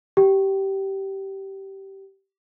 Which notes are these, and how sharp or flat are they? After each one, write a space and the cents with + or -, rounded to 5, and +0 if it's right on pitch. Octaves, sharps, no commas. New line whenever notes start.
G4 -15 G5 -25